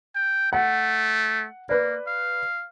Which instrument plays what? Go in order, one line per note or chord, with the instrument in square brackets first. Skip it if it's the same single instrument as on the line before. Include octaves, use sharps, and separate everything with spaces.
[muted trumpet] G5
[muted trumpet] A3 [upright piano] F#5
[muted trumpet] A#3 [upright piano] B4 D5
[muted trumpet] F5